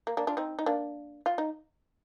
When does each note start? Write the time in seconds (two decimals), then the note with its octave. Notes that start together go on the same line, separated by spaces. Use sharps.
0.07 A#3
0.17 A#3 D4
0.27 D4 F4
0.37 C4 D#4
0.59 D#4
0.66 A#3 D4
1.26 F4
1.38 D#4